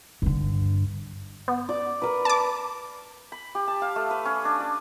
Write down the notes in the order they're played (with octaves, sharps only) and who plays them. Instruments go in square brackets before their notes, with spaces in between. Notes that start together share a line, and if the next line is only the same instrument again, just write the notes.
[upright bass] G2 D3
[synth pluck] B3
[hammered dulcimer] D5 D6
A#4 B4
[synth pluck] A5 D6
[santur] B5
G4
A5
F5
A3
B4
C#4
D4
D5